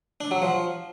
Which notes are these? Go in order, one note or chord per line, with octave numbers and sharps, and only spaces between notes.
D4
F#3
F3